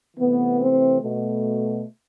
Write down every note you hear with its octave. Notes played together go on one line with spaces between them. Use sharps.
C3 E3 A3 B3
C4
B2 A3